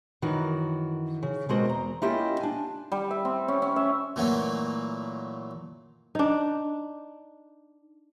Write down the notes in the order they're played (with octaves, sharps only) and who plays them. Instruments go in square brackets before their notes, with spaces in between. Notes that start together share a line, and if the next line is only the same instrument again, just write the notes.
[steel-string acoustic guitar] F#2 D#3 E3 F#4
C#3
B2 G#3 A#3 C4 F#4
E2 A#5
A#3 C#4 E4 F4 G4 D#5
D4 G#5
[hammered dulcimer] G3
E5
C4
C#4
C#4
E5
[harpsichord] A#2 E3 F#3 A3 A#3
[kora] D4 D#4